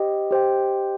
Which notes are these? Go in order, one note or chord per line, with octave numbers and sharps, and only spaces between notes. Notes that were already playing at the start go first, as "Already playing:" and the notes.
Already playing: G4 C5 D#5 G5
G4 C5 D#5 G5